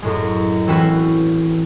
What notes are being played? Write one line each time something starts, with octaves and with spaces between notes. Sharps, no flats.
F#2 A2 G#3
E3 C4 C#4 E4 F#4 B4